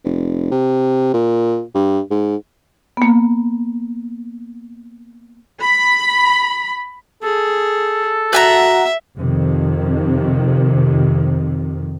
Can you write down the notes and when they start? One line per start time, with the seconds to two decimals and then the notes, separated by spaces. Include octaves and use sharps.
0.04 F1
0.51 C3
1.13 A#2
1.74 G2
2.10 G#2
2.97 A#3 B3
5.62 B5
7.23 G#4 A4
8.33 F#4 E5 F#5 G#5 A#5
9.18 F2 C3 D#3